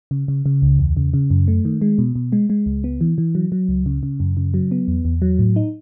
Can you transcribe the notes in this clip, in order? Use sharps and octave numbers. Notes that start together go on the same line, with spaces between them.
C#3
C#3
C#3
C#2
E2
C#3
C#3
F#2
A3
D#3
G#3
B2
B2
G#3
G#3
C#2
B3
E3
E3
F#3
F#3
C#2
C#3
C#3
F#2
C#3
F#3
B3
E2
E2
F#3
A2
D#4